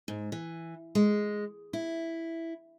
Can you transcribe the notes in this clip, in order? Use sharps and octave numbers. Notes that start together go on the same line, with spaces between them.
G#2
E3
G#3
E4